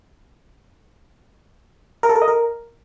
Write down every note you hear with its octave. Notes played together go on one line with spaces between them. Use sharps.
A#4
A4
A#4
D#5
A#4